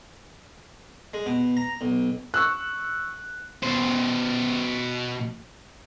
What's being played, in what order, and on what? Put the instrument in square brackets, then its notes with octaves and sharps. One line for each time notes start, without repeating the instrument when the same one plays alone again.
[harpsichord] G#3
B2
A#5
B1
[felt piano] C#6 E6 F#6
[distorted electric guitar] B2 C5